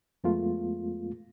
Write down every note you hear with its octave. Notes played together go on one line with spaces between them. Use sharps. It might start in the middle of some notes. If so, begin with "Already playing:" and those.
F2 G#3 A3 B3 F4